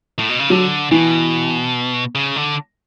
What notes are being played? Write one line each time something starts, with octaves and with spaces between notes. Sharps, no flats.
A2
B2
C#3
D3 F#3
B2 E3
C#3
D3